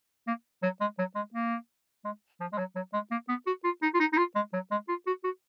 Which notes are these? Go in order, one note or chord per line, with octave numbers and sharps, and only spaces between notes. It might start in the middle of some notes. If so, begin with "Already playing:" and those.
A#3
F#3
G#3
F#3
G#3
A#3
G#3
F3
G#3
F#3
F#3
G#3
A#3
B3
F#4
F4
D#4
F4
D#4
D#4
F4
G#3
F#3
G#3
F4
F#4
F#4